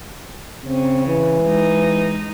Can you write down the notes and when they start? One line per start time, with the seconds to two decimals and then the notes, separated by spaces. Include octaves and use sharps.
0.66 C#3 C4
1.07 E3
1.44 G#3 D#4